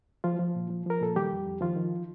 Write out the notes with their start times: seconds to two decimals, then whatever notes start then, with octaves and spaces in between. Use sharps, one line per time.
0.24 F3 F4
0.39 F3
0.56 A#2
0.70 F3
0.86 F3 A#4
1.01 A#2 A4
1.16 D#3 G3 G4
1.31 F2
1.46 F2
1.61 D#3 F3 F4
1.76 D#3